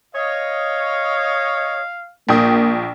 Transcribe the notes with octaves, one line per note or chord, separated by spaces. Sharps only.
C#5 D#5 F5
A#1 A#3 G5 D#6